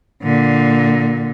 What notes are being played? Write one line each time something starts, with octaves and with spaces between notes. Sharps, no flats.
A#2 D3